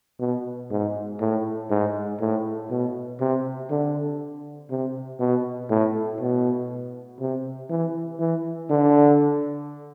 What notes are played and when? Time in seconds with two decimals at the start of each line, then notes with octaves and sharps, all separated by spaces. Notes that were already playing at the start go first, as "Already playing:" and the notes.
0.20 B2
0.71 G#2
1.20 A2
1.70 G#2
2.20 A2
2.70 B2
3.20 C3
3.71 D3
4.70 C3
5.20 B2
5.70 A2
6.21 B2
7.20 C3
7.70 E3
8.20 E3
8.70 D3